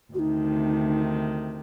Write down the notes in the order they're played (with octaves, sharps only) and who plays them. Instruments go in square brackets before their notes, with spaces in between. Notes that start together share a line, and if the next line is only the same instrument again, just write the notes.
[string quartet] D2 C3 D#3 [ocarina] D#4 F#4